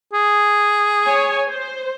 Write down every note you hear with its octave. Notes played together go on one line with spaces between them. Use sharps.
G#4
C#5 G#5
C5